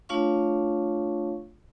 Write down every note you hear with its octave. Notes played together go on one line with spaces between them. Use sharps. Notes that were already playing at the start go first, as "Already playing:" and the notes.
A3 D4 F4 C#5 F5 C#6